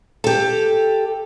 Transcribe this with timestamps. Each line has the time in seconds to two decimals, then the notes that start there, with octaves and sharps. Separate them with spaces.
0.24 G4 A4